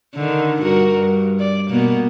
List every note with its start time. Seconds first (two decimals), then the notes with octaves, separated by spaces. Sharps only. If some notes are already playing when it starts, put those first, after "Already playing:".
0.16 D3 D#3
0.62 G2 F#4 A#4
0.94 G2
1.39 D5
1.69 B2 A#3 B3